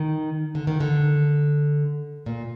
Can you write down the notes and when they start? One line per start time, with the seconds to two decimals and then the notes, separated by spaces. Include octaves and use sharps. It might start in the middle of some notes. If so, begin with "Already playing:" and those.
Already playing: D#3
0.55 D3
0.67 D#3
0.80 D3
2.26 A#2